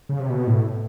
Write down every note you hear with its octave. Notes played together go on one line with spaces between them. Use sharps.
C#3
C3
B2
A2